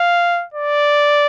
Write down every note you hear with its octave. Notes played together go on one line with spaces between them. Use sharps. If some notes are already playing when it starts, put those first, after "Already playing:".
Already playing: F5
D5